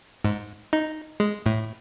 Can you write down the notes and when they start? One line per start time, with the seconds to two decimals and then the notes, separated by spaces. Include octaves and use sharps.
0.25 G#2
0.73 D#4
1.20 G#3
1.46 A2